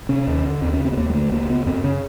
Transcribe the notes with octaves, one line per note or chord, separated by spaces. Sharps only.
C3 C#4
D#2
D3
D#2 C4
C#4
C#3
C4
B3
D#2 A#3
G#3
D3 A3
C#2 A#3
C#3 B3
F#2 C4
C#3 C#4